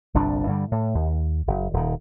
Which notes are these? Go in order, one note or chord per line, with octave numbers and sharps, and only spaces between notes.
G1 C2 A#2 D4
G2 D3 G3
A2
D#2
F#1
D#1 D#3